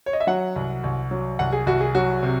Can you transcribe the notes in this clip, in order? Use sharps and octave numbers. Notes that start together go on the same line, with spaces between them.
C#5
D#5
E5
F#3 F#5
C2
C2
F#3
C2 F#5
G#4
C2 F#4
G#4
F#3 F#4
C3